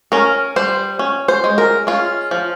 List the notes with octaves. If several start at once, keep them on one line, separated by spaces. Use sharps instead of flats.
C#4 A#4
G3 C5
C#4
C5
G#3
A#4
C#4 F4
F3